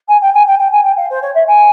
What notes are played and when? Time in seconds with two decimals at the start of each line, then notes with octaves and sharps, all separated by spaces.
0.08 G#5
0.21 G5
0.34 G#5
0.47 G5
0.59 G5
0.71 G#5
0.84 G5
0.97 F5
1.10 C5
1.22 C#5
1.34 E5
1.47 G#5